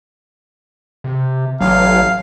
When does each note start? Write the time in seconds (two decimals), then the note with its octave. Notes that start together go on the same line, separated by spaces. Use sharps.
1.04 C3
1.60 A1 F#3 F5